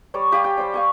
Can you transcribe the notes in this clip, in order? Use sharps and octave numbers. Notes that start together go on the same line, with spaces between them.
G3 C#5 D5
G4 F5 G#5
G5
G3 C5 D5
F5 G#5 C#6